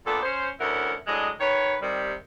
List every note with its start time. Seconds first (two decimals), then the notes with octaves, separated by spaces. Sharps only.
0.06 A#2 B3 D4 A4
0.23 C#4 C5
0.59 D2 C#4 E4 A#4 F#5
1.07 A2 F#3 G#3 D4 D#5
1.39 D#3 B4 C#5
1.82 C3 D#3 G3